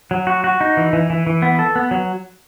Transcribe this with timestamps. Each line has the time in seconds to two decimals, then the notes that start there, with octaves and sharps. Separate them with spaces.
0.11 F#3
0.27 F#4
0.44 F#4
0.61 D#4
0.77 E3
0.93 E3
1.10 E3
1.27 E3
1.42 B3
1.59 A4
1.76 B3
1.91 F#3